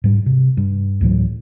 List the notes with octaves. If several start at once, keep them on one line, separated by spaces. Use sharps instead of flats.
G#2 G3
C3
G2
D2 A2 E3 F#3